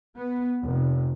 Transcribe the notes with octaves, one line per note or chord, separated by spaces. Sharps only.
B3
F1